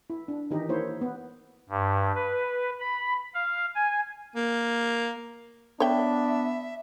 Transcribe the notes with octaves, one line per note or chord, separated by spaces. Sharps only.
E4
D4
D#3 E3 D#4 G4
A#3 E4 C5 C#5
B3
G2
B4
B5
F5
G#5
A#3
B3 D4 C#5 E5 G5